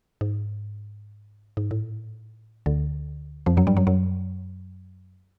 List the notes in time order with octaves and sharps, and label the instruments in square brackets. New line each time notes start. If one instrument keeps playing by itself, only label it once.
[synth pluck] G#2
G#2
A2
D2 D3
F2 F3
F#2 F#3
G2 G3
F#2 F#3
F#2 F#3